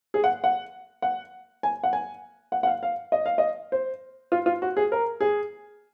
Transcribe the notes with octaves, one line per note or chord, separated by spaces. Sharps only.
G#4
F#5
F#5
F#5
G#5
F#5
G#5
F#5
F#5
F5
F5
D#5
F5
D#5
C5
F4
F4
F#4
G#4
A#4
G#4